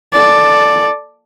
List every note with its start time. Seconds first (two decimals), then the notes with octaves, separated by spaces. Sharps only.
0.13 A4 D5